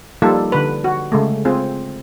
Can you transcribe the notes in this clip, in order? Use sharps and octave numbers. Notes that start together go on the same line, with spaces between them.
F3 G3 A#3 D#4 F4 A4
D3 B4
F#4
C#3 G#3 A3
C4 F4 G#4